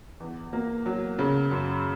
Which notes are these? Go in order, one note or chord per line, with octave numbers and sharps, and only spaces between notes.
E2
A#3
F#3
C#3
F#2